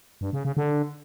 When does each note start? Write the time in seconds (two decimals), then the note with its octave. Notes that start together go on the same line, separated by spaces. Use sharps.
0.21 G2
0.33 C#3
0.45 C#3
0.57 D3